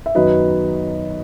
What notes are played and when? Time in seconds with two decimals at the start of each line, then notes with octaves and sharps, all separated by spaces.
0.06 E5
0.15 F#2 D#3 F#3 B3 B4 D#5